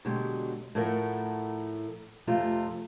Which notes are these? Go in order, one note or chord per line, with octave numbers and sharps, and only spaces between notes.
B2 D3 F#3 G#3 G4
A2 F3 A3 A4 A#4 F#5
F2 C3 A3 F4